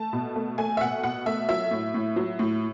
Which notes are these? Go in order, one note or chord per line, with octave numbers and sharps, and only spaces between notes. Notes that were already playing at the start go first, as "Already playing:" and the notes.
Already playing: A3 A5
B2
A3
A3 G#5
E5
B2 F#5
B2 F#5
A3 E5
F#3 E5
A2
A2
F#3
A2